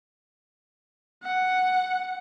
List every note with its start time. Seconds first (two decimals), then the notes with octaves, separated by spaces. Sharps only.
1.23 F#5